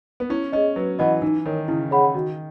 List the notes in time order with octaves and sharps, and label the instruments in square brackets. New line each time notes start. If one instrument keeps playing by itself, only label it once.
[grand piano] B3
[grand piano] C#4 [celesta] E4
[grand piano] C#4 [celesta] G#4 D#5
[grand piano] F#3 [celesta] B4
[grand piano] E3 [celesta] D#5 F#5 B5
[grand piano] E3 [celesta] D#4
[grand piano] D#3 [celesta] A#4 C#5
[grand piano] C#3 [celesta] E4
[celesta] G#4 C#5 F#5 B5
[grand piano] D#3 [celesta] F#4